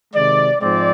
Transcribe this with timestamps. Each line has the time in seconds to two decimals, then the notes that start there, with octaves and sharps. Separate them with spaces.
0.14 C3 D#3 G#3 D5
0.60 G#2 F3 G#3 C4 D5